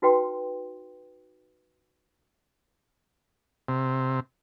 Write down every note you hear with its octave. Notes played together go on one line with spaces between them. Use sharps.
D#4 F#4 B4 G5 C6
C3